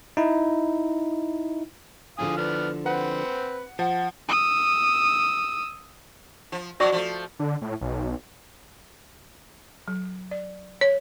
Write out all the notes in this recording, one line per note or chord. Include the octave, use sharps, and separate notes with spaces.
D#4 E4
D3 F3 E4 F5 G#5 D#6
B3 D4 F6
C4 B4 C5 F#5
F3 F#5 A5
D#6 E6
F3
B2 F3 F#3 F#4 D5 C#6
F3 A3
D3
A2
B1
F#3
D5
C#5